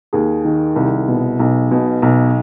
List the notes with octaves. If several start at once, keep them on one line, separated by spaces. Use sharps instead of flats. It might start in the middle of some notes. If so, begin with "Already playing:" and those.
D#2 G#4
D#3
C2
B2
B1
B2
B1